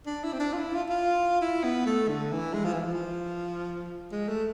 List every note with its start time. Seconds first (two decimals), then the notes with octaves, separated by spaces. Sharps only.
0.06 D4
0.24 E4
0.33 C4
0.40 D4
0.53 F4
0.58 E4
0.74 F4
0.89 F4
1.42 E4
1.64 B3
1.86 A3
2.09 D3
2.32 E3
2.54 G#3
2.64 F3
2.74 E3
2.84 F3
4.12 G#3
4.29 A3